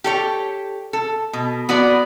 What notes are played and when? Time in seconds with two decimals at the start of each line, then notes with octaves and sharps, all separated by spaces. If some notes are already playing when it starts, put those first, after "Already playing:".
0.04 G4 A4 C#5
0.93 A4
1.33 B2
1.69 B3 F#4 B4 D5